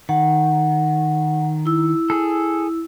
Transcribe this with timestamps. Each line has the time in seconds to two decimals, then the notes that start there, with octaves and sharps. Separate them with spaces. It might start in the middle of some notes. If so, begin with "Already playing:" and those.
0.09 D#3 F#5
1.66 E4 E6
2.10 G#4 A4